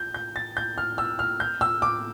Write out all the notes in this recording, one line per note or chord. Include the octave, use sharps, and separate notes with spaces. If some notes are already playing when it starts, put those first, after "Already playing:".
Already playing: G6
G6
A6
G6
F6
E6
F6
G6
E6
D6